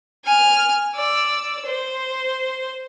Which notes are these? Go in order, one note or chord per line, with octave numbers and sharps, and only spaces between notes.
G#5 F6
D5 E6
C5